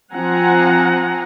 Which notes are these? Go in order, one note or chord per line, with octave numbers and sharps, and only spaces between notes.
F3 C4 F#5 G#5 A#5